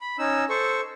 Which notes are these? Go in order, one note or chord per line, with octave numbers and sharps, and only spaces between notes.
B5
C#4 D#4 E6
A4 C5 C#6